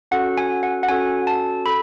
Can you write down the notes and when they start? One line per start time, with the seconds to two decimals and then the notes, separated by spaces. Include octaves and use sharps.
0.11 C#4 F#4 A4 F#5
0.38 G#5
0.63 F#5
0.83 F#5
0.89 C#4 F#4 A4 G#5
1.27 A5
1.66 A4 B5